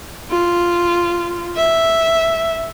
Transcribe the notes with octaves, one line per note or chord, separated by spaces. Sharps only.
F4
E5